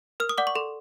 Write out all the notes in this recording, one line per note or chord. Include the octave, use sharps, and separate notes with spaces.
A#4 F6
D#6
D5 F#5 D6
C#6
A4 C6